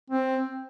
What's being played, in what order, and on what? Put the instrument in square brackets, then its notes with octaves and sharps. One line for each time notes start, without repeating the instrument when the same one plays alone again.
[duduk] C4